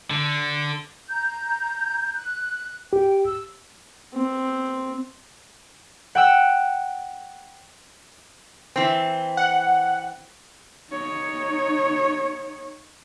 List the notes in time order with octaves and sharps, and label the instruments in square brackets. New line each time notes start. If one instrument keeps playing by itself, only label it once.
[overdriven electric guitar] D3
[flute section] A#5 G6
F#6
[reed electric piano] G4 [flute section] G5
[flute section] E6
[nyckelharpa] C4
[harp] F#5 G5 E6
[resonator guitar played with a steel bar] E3 C4
[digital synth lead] F#5
[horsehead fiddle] D#4 C#5